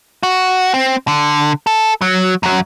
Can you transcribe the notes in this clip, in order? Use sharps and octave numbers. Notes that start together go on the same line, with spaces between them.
F#4
C4
D3
A4
F#3
F#2 F#3